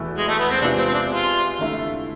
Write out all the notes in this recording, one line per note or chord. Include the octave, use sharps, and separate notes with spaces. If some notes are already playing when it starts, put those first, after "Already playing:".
Already playing: E2 B2 A3 E4 B4
G#3
A3
B3
C4
C3 G#3 B3 D4 F4 G#4
C4
C4
D4
F4
D3 A3 E4